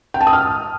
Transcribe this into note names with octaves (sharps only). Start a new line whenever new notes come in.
G5
A5
D#6
F6